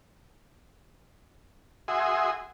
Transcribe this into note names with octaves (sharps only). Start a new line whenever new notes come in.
F#4 G#4 E5 G#5 C6 D#6